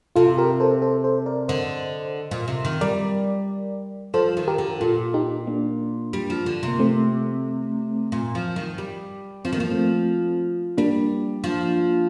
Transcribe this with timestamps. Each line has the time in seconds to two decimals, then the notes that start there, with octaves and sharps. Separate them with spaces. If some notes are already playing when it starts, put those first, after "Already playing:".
0.16 C3 F4 A4
0.37 G4 A#4
0.60 A4 C5
0.82 A4 C5
1.04 A4 C5
1.26 A#4 D5
1.48 D3 C5 D#5
2.31 A#2
2.48 C3
2.65 D#3
2.81 G3 A#4 D5
4.14 F3 A4 C5
4.37 D#3
4.48 G4 A#4
4.58 D3
4.80 A#2 F4 A4
5.14 D#4 G4
5.47 A#3 D4
6.13 G3
6.30 F3
6.46 D3
6.63 C3 A#3
6.79 A3 C4
8.12 A#2
8.35 F3
8.56 D#3
8.78 G3
9.45 F3 C4
9.53 D#3
9.58 F3 A#3
9.71 A3 C4
10.78 G3 A#3 D4
11.44 F3